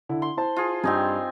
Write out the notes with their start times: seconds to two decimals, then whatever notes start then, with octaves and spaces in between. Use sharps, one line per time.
0.09 D3 E4
0.22 C6
0.37 E4 C5 A5
0.56 F4 G#4
0.84 G2 C4 D#4 G5 G#5